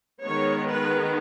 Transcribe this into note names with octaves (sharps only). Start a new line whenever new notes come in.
D#3 G#3 B3 C#5
B4